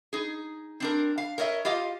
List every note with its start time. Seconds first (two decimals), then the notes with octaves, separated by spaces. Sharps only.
0.13 D#4 G#4
0.80 C4 D4 A#4
1.18 F5
1.38 A#4 C#5 D#5 E5
1.65 F4 G4 D#5 F5